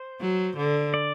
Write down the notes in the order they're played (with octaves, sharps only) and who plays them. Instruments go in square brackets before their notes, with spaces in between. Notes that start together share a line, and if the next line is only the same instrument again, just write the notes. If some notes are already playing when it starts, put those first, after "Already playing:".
Already playing: [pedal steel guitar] C5
[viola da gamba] F#3
D3
[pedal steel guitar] D5